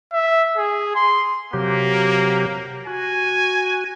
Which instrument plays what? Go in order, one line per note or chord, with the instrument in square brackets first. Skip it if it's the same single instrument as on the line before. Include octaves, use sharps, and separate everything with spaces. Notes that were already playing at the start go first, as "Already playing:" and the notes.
[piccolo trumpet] E5
G#4
C6
[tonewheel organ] C3 F#3 G4 [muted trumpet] A#3
[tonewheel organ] F#4 [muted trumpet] G#5